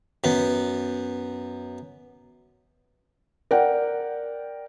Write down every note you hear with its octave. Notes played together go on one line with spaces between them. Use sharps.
F#2 B3
A#4 D5 F#5 G5